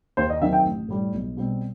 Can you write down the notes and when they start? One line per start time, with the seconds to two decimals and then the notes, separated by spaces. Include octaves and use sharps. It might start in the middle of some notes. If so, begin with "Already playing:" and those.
0.17 D#2 C5
0.30 D#5
0.41 D#3 F#3 C4 E5
0.53 G5
0.65 A1
0.88 A2 G3
1.13 B1
1.37 B2 G3 C4